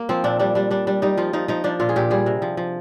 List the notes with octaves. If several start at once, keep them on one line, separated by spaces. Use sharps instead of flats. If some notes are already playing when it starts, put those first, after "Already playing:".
Already playing: A#3
F3 C4
A#2 D4
G3 D4
G3 D4
G3 D4
G3 D4
G3 D#4
F3 F4
F3 D#4
F3 D#4
F3 D4
A#2 F4
G#4
A#2 G4
G3 G#4
C3
F3
F3